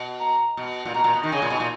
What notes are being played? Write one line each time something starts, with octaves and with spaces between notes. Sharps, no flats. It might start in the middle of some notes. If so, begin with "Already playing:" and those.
Already playing: B2
A#5
B2
A#2
B2 A#5
A#2
B2
D#3
C#3 G#5
A#2
B2
A#2